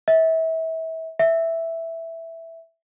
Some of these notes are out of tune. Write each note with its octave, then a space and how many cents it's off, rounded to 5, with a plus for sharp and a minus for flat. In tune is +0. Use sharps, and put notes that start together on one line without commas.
E5 -30
E5 +0